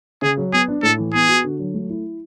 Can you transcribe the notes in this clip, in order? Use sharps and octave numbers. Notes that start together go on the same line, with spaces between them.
C#3 G#4
F#3
B3 G#4
D4
A2 A4
E3
B3 G#4
F#4
D3
F#3
A3
E4